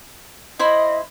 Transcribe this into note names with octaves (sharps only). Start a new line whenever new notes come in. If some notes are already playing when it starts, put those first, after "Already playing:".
E4 C5 D#5 B5